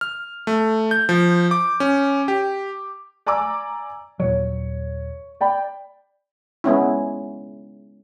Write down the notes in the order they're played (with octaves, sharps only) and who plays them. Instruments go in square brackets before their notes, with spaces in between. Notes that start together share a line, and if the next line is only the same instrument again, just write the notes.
[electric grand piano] F6
A3
G6
F3
D6
C#4
G4
[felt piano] D5 G#5 A#5 D6 E6
[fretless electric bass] D#2 A#2 F#3 [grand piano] C#5
[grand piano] D5 G5 B5
[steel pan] G#3 B3 C#4 E4